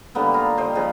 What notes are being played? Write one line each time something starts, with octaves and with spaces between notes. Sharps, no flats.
D3 G3 A#3 B3
F4 A#5
G3 C5 D#5 G5
C#3 F3 G#4